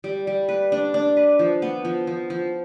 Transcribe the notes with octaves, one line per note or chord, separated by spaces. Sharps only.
G3
G3
B4
D4
D4
B4
F3
B3
F3
F3
F3